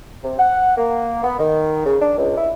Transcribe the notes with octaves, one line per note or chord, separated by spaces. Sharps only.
C3
F#5
A#3
B3
D#3
C#3
D4
C#2
E4